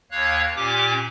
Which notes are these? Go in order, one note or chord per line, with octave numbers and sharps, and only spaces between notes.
D#2 C#5 F5 F#6
A#2 C#4 G4 D6